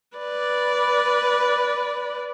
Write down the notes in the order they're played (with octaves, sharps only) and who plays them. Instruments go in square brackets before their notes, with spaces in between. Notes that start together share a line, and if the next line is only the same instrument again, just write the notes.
[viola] B4 D5